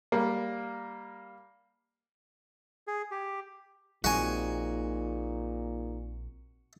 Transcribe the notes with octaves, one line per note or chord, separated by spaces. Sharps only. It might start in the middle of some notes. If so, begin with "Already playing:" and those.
G3 A#3
G#4
G4
A#1 A#2 F3 C4 D#4 F#4 G#4 G#5